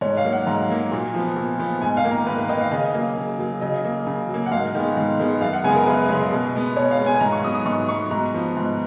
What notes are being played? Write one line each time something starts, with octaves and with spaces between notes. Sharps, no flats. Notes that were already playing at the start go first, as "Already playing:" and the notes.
G#2 C#5
F5
F#3 A#3
F#5
G#2 A#5
F#3 A#3
A#2
F3 B3
A#2
F3 B3
G#2 G#5
F5
D#3 A#3
A#5
G#2 B4
B4
D#3 A#3 D#5
F5
C#3 D#5
F#3 A#3
C#3
F#3 A#3
C#3 D#5
F#3 A#3
C#3
F#3
A#3
F#5
G#2 F5
D#3 G#3 B3
G#2
D#3 G#3 B3
F#2 F5
F#5
C#3 G#3 B3 G#5
A#4
F#2 B4
C#3 G#3 B3
B2
G#3 B3
B2 C#5
F5
G#3
B3 G#5
G#5
G#2 A#5
C#6
F#3 B3 D#6
D#6
G#2 C#6
F#3 B3 C#6
G#2 A#5
F3 B3
G#2